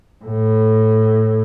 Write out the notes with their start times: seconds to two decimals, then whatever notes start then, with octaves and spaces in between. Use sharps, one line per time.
0.25 A2